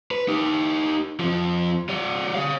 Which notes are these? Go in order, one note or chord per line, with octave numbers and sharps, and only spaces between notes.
B4
D#4 G4
F2 F3
G3 C#5
C#5 F5